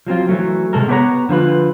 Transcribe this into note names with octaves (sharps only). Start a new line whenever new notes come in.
F3 F#3 C4 F4
E3 F#3 A3
C3 G#3 A4 A#4
B3 G4 B4 C#5 F#5 A#5
D3 F3 F4 B4